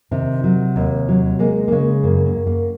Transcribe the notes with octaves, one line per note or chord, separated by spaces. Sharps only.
C3 D#3 C4
F#3
D#2
F#3
G#3 A#3
A#3
C#3 G#3
F#2 A#3
A#3
F#2
A#3